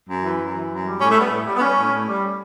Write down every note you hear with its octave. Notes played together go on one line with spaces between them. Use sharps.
F#2
E3
F#2
E3
F#2
G3
A2 C#4
A3
G3 B3
A2
G3
B3
G3 C#4
A2
A2
G3